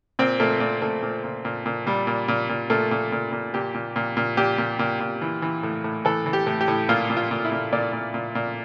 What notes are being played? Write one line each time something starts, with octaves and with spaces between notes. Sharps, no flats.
A#2 C4
A#2 A3
A#2
A#2 A3
A#2
A#2
A#2
A#2
A#2 G3
A#2
A#2
A#2
A#2 A3
A#2
A#2
A#2
A#2 G4
A#2
A#2
A#2
A#2 G4
A#2
A#2
A#2
E3
E3
A2
A2
E3 A4
E3
G4
A2
G4
A2
A#2 F4
A#2
F4
A#2
E4
A#2
A#2 D5
A#2
A#2
A#2